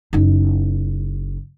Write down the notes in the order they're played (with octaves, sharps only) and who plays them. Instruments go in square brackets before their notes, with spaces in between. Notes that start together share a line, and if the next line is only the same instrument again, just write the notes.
[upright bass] F#1 D#4